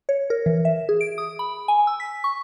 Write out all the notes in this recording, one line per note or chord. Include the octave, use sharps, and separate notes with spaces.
C#5
A#4
E3
E5
G#4
D7
D#6
B5
G#5
E6
B6
C#6